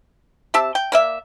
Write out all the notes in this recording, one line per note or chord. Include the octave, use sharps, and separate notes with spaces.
C4 G4 E5 A5
G5
A#3 D5 E5